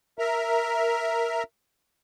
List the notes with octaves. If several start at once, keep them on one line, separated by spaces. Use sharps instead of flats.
A#4 E5 A#5